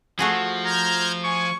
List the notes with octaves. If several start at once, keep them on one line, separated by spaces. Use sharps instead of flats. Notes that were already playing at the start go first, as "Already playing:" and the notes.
F3 A3 F#4 G#4
A#5 F6 G6 G#6
G#5 C#6